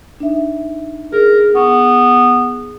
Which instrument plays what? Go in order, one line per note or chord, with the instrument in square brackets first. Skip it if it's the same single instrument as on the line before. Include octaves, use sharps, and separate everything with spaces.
[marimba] D4 D#4 E5
[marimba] G#4 [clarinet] A#4
[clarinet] B3 [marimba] C#6